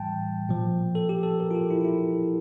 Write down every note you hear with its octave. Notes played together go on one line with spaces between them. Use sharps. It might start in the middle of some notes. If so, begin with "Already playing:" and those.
Already playing: A2 E3 G3 G5 A5
A#2 F3
A4
G4
A4
A#4
F4
G4
E4
F4
E4